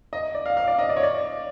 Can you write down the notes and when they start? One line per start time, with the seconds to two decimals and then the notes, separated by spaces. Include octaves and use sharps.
0.13 D#5
0.34 D5
0.46 F5
0.57 F5
0.67 D5
0.78 D#5
0.89 D5
0.96 C#5
1.03 D5